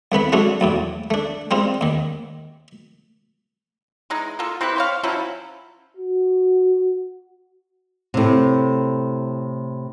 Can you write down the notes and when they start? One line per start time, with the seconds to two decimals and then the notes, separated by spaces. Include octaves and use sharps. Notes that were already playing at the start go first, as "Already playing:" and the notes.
0.12 C2 A3 B3 B5
0.32 F#3 G#3 A3 C#4 D4
0.61 B1 E2 A2
1.10 A3 D4
1.51 G3 G#3 C4 F4
1.81 D#2 D#3
4.10 E3 G#3 D#4
4.39 A#3 F4 A4
4.61 C4 E4 G4 B4
4.76 C5 C#5 F5
5.03 F3 F#3 C#4 E4
5.97 F#4
8.14 A2 C3